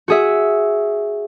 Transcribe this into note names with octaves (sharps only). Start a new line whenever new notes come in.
F#4 G#4 E5